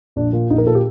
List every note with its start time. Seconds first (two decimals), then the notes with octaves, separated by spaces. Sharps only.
0.16 A#1 D4
0.33 A#2
0.50 A#1 D#4
0.58 A#4
0.66 A#2 A4
0.75 G4